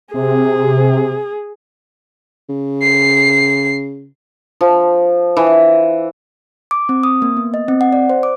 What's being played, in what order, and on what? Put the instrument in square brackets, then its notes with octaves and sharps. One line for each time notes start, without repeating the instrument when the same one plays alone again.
[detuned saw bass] C3 [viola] G#4
[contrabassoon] C#3
[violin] C7
[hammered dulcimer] F3
E3
[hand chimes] D6
C4
D#6
A#3
B3
D#5
C4
F#5
D5
C5
D6